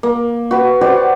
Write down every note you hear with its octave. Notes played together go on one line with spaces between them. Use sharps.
A#3
F#4 B4
F#4 G4 C5 D5